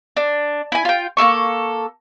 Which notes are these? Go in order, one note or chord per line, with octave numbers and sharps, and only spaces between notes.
D4
E4 G#5
F4 G5
A#3 E4 A4 C#6